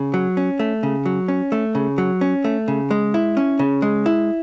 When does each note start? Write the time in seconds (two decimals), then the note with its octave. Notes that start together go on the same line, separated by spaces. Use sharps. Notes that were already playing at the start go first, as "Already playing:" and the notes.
Already playing: C#3
0.14 F#3
0.37 C#4
0.59 A3
0.83 C#3
1.06 F#3
1.28 C#4
1.52 A3
1.75 C#3
1.98 F#3
2.21 C#4
2.44 A3
2.68 C#3
2.91 G#3
3.14 E4
3.37 C#4
3.59 C#3
3.82 G#3
4.06 E4